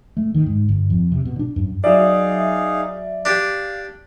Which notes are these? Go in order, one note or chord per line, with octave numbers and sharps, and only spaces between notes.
A3
D#3
G#2
G1
F2
C3
B2
D4
F#2
F#3 D#4 G#4 D5 E5 F5
D4 G4 F5